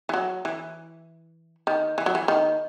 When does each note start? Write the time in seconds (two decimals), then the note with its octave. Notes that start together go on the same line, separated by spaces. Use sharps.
0.09 E3
0.14 F#3
0.45 E3
1.67 D#3
1.98 E3
2.06 F#3
2.15 E3
2.28 D#3